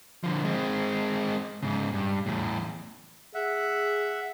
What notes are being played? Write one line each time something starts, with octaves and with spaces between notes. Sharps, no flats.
D3 F3
G#3 C4
G#2 C#3
G2
E2 A2
G#4 E5 F#5